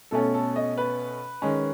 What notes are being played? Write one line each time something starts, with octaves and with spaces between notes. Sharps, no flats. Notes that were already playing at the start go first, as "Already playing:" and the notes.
B2 A3 C#4 A4
A4
D#5
B4
D#3 G#3 C#4